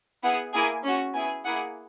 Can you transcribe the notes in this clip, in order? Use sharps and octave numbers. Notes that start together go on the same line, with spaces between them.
B3 E4 G#4 F#5
A#3 E4 G#4 G#5
C#4 F#4
B3 E4 G#4 G#5
A#3 E4 G#4 F#5